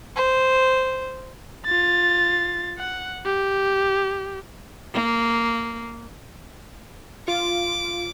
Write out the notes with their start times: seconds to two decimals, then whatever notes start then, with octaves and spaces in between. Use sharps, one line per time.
0.16 C5
1.66 F4 A6
2.78 F#5
3.25 G4
4.93 A#3
7.28 F4 D6